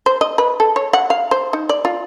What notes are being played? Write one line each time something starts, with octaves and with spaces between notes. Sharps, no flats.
C5
D#5
B4
A4
C#5
F#5
F5
C5
D#4
D5
F4